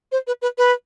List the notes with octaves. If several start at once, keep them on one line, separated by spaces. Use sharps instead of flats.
C5
B4
B4
B4